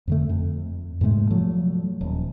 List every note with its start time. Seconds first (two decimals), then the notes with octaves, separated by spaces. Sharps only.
0.07 F2 D3 A3
0.29 F2
1.01 G#2 C3 G#3 A3
1.30 F3 F#3 A3
2.01 D#1